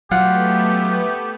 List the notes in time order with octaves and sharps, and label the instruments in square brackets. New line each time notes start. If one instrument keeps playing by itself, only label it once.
[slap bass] F#3 [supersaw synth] A3 B3 [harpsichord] F4 F#5 [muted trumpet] G4